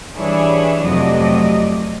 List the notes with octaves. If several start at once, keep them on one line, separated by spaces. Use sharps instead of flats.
E3 G3 D4 E4 G#4 C#5
F2 C3 F#3 A3 D5 D#5